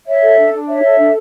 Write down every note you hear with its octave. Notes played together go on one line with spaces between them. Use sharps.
C#5 E5
A4
D4
D4
C#5 E5
A4
D4